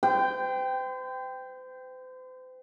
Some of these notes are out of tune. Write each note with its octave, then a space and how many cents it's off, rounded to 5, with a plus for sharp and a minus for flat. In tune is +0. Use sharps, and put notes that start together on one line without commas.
C5 -40 G5 +0